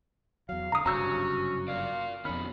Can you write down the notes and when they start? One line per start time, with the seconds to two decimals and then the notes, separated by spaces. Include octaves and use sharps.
0.49 E2 F#3 F5
0.72 D3 A#5 D#6
0.86 F#1 G2 C3 C#4 F#4 A#5 E6 G6
1.68 A#4 D5 F5
2.25 F2 B2 D#3 C#4 B5 F6